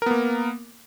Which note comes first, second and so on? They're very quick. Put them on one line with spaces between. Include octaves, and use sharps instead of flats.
A#4 B3 A#3